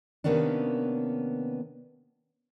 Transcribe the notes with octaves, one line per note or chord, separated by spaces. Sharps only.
C3 D#3 A#3 B3 C#4 D4